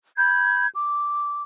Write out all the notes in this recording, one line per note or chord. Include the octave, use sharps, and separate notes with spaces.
B5 G6 G#6
D6